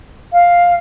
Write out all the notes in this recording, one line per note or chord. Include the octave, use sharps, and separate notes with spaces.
F5